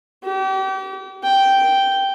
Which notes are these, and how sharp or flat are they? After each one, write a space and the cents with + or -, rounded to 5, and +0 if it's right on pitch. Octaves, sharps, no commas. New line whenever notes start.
G4 -35
G5 -5